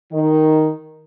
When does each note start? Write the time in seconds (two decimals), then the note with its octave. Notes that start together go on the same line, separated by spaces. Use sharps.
0.11 D#3